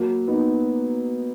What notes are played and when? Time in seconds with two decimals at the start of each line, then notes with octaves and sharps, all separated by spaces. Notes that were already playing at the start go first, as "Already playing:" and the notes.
Already playing: F#3 A#3
0.27 B3 D#4